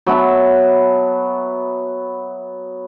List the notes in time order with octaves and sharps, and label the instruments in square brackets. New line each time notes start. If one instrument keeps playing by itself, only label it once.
[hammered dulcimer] F#3 B3 E5 A5